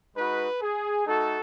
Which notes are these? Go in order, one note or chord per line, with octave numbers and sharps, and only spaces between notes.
G#3 D#4 F#4 B4
G#4
A3 D#4 F#4 A4